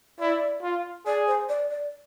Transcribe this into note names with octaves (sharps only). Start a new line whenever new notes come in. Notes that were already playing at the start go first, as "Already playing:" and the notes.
E4 D5
F4
G#4 D5
C5
D5
D5